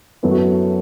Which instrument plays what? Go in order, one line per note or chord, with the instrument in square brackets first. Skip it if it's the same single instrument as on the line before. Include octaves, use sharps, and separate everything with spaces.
[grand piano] F#2 F#3 B3 E4 A4
F#4
A4